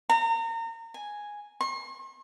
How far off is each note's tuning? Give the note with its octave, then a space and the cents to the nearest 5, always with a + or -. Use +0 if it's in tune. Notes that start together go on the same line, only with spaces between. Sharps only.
A#5 -35
G#5 +0
C6 +45